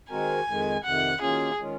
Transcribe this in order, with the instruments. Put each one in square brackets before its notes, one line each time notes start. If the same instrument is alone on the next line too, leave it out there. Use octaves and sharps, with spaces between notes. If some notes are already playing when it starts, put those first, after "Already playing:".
[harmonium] D#3 G#3 C4 F#4 A#4 [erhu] G#5
[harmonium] F2 D#3 G#3
[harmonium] F2 C3 D#3 [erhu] F#5
[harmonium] D#3 F#3 A#3 C#4 F4 [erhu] G#4
[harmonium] D#3 G#3 C#4 F4